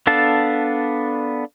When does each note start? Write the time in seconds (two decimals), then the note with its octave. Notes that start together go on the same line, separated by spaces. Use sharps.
0.07 B3 D4 A4 F5 A5